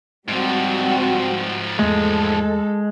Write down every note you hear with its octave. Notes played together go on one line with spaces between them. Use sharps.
G#2 F3 G3 C4 F#4
E2 G#3 A3 A4